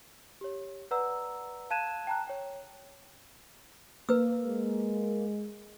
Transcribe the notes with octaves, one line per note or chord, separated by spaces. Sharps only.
G4 C#5
B4 D5 F#5 A#5 E6
F5 A5 F#6 G#6 D#7 E7
G5 A5 A#5 F#6
C#5 G5
A#3 B4 E6
G#3